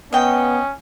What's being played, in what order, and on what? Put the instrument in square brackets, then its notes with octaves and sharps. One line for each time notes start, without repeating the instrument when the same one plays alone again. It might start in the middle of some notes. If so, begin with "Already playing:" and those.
[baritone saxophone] B3 [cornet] C#4 [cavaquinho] D#5 G5